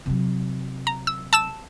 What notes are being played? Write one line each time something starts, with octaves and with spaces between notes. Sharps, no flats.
C3 F#3
A#5
E6
A5 E6 E7